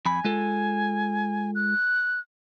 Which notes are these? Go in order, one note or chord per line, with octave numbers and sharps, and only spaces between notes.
F2 G#5 B5
G#3 F4 A4
F#6